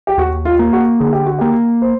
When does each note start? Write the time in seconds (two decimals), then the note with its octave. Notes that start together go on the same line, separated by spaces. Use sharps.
0.07 G4
0.18 D#2 F#4
0.45 F4
0.59 A#3
0.73 F#4
0.99 D3 G#4
1.13 G4
1.26 F#4
1.39 A#3 G4
1.82 C5